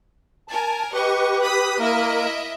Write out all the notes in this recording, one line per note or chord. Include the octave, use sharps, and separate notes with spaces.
A#4 G#5 A5
G4 B4 D#5 C#6
B5 D#6 B6
A#3 E4 A#4 D#5 E5